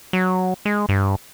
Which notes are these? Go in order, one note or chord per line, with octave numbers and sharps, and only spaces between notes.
F#3
G#3
G2